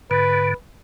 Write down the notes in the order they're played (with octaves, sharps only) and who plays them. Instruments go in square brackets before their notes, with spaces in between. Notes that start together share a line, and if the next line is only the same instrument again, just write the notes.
[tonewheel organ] G#2 D3 [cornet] B4